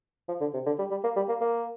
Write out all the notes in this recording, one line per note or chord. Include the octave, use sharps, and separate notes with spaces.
F3
D3
C3
D3
G3
G3
A#3
G3
A#3
A#3